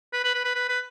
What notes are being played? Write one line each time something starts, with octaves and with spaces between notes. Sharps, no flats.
B4
B4
B4
B4
B4
B4